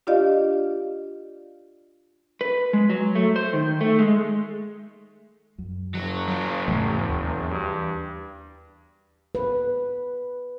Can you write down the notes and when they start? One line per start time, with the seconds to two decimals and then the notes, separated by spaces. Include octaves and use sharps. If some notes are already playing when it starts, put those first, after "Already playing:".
0.07 D4 F4 G4 D5 D#5 F5
2.41 B4
2.73 G#3
2.90 F#3
3.15 A3
3.36 C5
3.53 D#3
3.81 A3
3.99 G#3
5.58 F#2
5.95 F#1 F#3
6.28 F#3 F4
6.68 E2 G#2 C3 A3
7.09 D#2
7.50 G2
9.35 B4